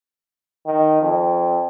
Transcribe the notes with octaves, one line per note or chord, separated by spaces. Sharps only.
D#3
F2